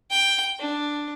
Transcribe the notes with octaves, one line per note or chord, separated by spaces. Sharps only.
G5
D4